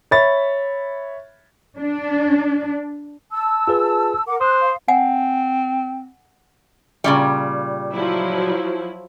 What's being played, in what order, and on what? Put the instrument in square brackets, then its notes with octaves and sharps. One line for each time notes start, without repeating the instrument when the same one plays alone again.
[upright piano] C#5 E5 B5 A6
[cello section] D4
[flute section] A5 E6
[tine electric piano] F4 G#4 B4
[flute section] A#4 F#5 D6
[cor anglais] C5 [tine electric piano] D#6 [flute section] F#6
[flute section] F5
[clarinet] C4 [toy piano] F#5 G#5
[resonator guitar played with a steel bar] A#2 C#3 G3
[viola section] F3 F#3 E4